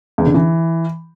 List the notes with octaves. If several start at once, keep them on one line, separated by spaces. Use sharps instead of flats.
E2
D3
E3